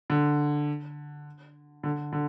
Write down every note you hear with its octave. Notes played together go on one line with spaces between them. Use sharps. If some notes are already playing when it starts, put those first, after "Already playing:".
D3
D3
D3